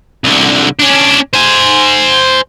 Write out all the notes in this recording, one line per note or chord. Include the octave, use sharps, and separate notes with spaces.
C2 D3
C#4 D4
C5 G#5